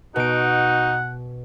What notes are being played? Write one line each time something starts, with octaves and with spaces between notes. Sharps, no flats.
B2 D#4 F#4 F#5 D7